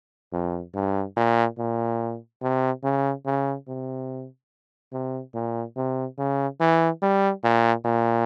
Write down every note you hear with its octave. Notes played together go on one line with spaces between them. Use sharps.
F2
G2
A#2
A#2
C3
C#3
C#3
C3
C3
A#2
C3
C#3
E3
G3
A#2
A#2